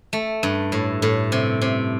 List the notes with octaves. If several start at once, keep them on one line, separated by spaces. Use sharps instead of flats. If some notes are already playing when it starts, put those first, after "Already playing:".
A3
G2
A2
A2
C3
C3